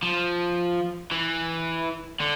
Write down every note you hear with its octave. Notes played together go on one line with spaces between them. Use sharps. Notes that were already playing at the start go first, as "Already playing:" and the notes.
F3
E3
D3